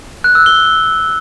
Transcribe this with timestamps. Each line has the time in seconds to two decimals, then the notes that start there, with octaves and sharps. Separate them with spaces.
0.24 F#6
0.35 E6
0.46 G7